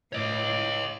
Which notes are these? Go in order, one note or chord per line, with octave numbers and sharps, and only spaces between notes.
A2 C#5 D#5